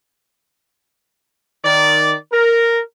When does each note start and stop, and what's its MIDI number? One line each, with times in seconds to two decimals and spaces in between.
1.64 2.14 51
1.64 2.14 74
2.32 2.79 70